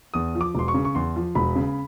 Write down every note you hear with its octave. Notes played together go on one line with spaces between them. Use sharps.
E2 D#6
F3
D6
E1 C6
C#6
C#3
C#6
E2 C6
F3
E1 B5
C#3